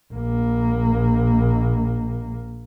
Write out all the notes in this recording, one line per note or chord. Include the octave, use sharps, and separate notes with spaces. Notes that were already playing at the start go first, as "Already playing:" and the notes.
A#1 A#3